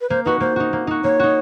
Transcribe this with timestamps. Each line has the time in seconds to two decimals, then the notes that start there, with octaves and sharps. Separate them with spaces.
0.01 B4
0.09 A#3 C5
0.25 D#4 F#4 B4
0.40 A#3 C5
0.56 D#4 F#4
0.73 A#3
0.87 D#4 F#4
1.04 A#3 C#5
1.20 D#4 F#4